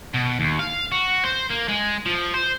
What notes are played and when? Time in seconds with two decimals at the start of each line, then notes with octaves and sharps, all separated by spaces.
0.14 B2
0.40 D#2
0.59 F5
0.92 F#4
1.24 C5
1.50 A#3
1.68 G#3
2.06 F3
2.34 C5